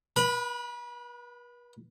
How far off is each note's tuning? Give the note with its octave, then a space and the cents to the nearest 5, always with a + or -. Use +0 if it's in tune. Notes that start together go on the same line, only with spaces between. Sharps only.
B4 -40 B5 +0